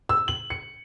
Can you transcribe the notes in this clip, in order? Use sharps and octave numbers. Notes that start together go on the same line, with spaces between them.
E6
F#7
C#7